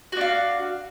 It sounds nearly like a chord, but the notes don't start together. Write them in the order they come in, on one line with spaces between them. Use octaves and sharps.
F#4 D4 F5